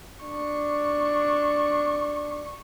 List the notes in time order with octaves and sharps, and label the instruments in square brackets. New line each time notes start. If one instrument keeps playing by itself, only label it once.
[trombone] D4 [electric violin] C#6